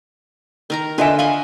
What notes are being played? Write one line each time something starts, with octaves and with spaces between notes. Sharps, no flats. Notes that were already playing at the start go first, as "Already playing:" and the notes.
D#3 A#4 A#5
D3 D4 F4 B4 D#5 E5 G#5
D#5 F5 B5 C#6